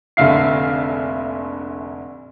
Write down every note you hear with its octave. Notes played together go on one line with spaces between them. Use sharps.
F1 A#1 D3 E5 F5 C7